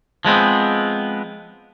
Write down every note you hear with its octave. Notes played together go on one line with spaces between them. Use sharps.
F3 G#3 B3 C4